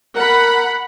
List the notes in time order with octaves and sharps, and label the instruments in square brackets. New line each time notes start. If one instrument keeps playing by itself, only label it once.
[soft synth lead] A#4 [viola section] F#5 B5